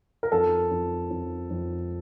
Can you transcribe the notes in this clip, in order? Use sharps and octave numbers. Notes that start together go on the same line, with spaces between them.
A#4
F2 A4
F2
F2
F2